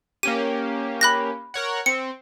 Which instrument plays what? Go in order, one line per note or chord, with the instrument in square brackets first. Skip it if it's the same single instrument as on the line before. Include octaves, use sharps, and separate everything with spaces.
[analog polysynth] A#3 C#4 G4 [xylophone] D#7
[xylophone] B5 F#6 A#6
[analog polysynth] A#4 C#5 F#5
[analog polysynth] C4 [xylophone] C#7